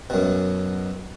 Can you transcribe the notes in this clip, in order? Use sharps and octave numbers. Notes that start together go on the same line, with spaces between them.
F#2 B2